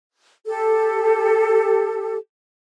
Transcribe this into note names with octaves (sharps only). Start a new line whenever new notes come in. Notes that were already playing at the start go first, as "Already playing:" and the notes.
G4 A4